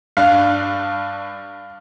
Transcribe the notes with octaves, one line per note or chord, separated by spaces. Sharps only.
G2 D4 F5 F#6